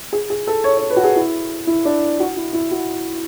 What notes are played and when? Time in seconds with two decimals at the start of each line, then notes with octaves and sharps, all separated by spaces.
0.12 G#4
0.30 G#4
0.47 A4
0.64 C#5
0.77 C#5
0.90 B4
0.96 F#4
1.04 G#4
1.16 E4
1.67 E4
1.85 D4
2.20 F#4
2.37 E4
2.53 E4
2.71 F#4